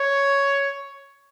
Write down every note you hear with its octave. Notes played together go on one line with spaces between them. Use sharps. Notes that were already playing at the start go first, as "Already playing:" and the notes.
Already playing: C#5